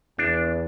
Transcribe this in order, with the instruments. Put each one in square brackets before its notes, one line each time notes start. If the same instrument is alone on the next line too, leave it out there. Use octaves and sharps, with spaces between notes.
[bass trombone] E2 [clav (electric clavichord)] D4